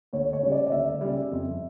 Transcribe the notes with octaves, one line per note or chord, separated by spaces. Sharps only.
D2 C#5
C#5
C#3 G3
D5
D5
D2 E5
C#3 G3
F2